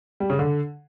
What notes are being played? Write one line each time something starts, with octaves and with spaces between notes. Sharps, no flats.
G3
C#3
D3